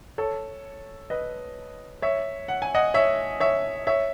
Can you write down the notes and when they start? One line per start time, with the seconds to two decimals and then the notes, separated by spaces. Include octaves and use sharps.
0.18 A4 C#5
1.10 B4 D#5
2.02 C#5 E5
2.48 F#5
2.62 G#5
2.74 D#5 F#5
2.94 C#5 E5
3.40 C#5 E5
3.87 C#5 E5